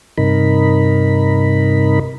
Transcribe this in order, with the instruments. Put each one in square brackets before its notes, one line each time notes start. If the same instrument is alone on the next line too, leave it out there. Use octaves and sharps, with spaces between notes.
[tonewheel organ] G2 C3 D#4 A#4 B5